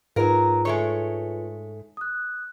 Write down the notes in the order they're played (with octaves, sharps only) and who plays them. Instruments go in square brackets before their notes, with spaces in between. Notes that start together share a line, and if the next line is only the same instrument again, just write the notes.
[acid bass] G#2 [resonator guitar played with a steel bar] F#3 A#4 [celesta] F4 G#4 B4
[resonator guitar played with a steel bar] G#3 A3 C#5
[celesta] D#6 F#6